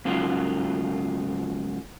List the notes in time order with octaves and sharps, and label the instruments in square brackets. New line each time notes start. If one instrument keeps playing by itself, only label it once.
[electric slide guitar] G#2 C#3 F#3 F4